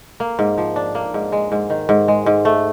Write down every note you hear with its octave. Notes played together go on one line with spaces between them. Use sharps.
A#3
G#2
F3
D4
A#3
G#2
G#3
G#2
D#3
G#2
G#3
G#2
A3